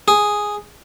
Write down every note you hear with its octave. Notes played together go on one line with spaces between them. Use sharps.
G#4